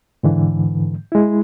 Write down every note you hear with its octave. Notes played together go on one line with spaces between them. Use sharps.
G#2 D3 E3
G#3 E4